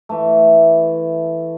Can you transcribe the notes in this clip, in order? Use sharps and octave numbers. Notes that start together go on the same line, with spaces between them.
E3 A3